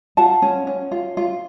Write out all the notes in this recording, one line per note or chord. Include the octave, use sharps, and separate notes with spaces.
F4 F#5 A5
C#4
C#4
F4
F4